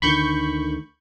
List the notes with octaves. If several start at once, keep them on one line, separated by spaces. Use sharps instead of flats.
D2 D3 D#3 B5 C#6 G6